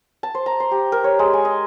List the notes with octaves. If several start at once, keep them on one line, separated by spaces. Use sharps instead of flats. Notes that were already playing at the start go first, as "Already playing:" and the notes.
A5
C5
A#5
C6
G4
A#4
C#5
G#3
G#5
D#5